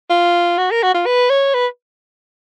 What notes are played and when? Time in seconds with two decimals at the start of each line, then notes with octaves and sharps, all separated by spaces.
0.10 F4
0.58 F#4
0.71 A#4
0.83 F#4
0.94 F4
1.06 B4
1.30 C#5
1.54 B4